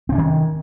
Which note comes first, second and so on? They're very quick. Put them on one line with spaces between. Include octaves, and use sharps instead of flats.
C4 C3 C#4 D#3